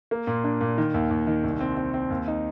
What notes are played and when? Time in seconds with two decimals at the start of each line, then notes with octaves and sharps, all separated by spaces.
0.11 A#3
0.27 A#2
0.44 D4
0.61 A#2
0.78 D#3
0.94 D#2
1.11 D#2
1.27 D#3
1.44 C2
1.60 C4
1.77 C4
1.94 C4
2.11 D#2
2.27 D#4